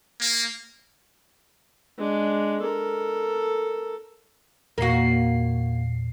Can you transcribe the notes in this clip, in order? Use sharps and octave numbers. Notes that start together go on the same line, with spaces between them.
A#3
G#3 D4
A4 A#4
E2 A#2 A#3 F#4 C7